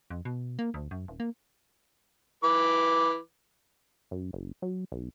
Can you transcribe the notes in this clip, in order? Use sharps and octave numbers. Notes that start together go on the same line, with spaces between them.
F2
B2
A#3
D2
F#2
D#1
A#3
E3 B4 D6
F#2
F#1
F#3
B1